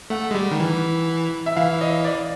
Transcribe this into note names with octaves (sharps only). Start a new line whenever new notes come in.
A3 F#5
G#3
G3
D#3
E3
E5
E3 F5
D#5
D5